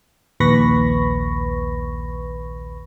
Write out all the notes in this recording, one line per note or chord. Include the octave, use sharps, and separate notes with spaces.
A#1 D#2 B4 B5 C#6 A#6